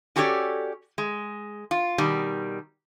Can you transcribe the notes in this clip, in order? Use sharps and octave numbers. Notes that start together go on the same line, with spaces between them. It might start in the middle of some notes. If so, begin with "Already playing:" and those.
C#4 F#4 G4 A4 C#5 D5
G#3
F4
B2 D#3 G3